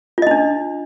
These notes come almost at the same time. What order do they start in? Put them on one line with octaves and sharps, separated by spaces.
F4 D#5 D#4 D4